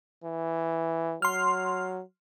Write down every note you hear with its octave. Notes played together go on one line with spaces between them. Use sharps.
E3
F#3 C6 F6